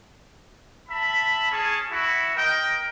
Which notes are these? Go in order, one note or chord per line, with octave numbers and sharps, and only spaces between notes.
E5 A5 B5
C#4 G#4 G#5 A5
E4 F#4
A#4 D#5 G5